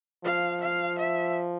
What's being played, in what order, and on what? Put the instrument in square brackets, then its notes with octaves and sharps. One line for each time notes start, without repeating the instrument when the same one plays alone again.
[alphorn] F3 [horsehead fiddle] F5
[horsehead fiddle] F5
E5